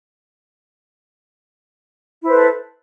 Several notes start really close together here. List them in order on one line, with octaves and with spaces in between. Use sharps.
E4 C5 B4 A4